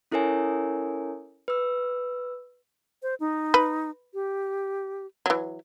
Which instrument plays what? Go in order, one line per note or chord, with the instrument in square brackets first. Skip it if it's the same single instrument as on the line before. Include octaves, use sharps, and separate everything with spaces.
[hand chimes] C#4 E4 A4 A#4 C#5 G#5
B4 E6
[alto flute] C5
D#4
[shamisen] B4
[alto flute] G4
[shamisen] E3 F#3